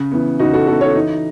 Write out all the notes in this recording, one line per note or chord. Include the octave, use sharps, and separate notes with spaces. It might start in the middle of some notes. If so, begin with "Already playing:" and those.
Already playing: C#3
E3 B3
C#3 D#4 F#4
F#4 A4
E3 B3 F#4 A4
A4 C#5
E3 D#4